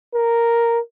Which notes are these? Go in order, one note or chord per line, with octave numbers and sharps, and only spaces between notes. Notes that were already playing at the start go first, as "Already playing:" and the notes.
A#4